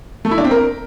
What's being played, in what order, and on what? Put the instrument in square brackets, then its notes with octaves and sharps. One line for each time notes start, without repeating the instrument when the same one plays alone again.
[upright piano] A3
E4
D4
C4
A#4